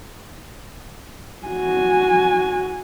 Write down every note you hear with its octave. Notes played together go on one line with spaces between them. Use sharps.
F#4 G#5